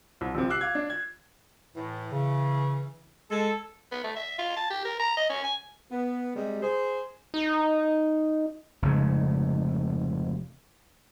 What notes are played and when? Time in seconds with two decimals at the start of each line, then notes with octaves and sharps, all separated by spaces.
0.21 C2
0.35 A#1 C3
0.49 D6 E6 F#6 C7
0.61 F5 D6 G#6
0.75 D4
0.90 G#6
1.76 A2 E3
2.12 C#3
3.31 G#3 A4
3.91 B3
4.04 A3
4.16 E5
4.39 F4
4.57 A5
4.70 G4
4.85 A#4
5.00 A#5
5.17 D#5
5.29 C#4
5.44 G#5
5.92 B3
6.35 C3 G3 G#3
6.63 G#4 C5
7.34 D#4
8.82 F1 G#2 C#3